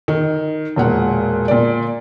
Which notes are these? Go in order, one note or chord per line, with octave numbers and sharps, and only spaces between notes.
D#3
E1 A#2 F#5
A#2 D5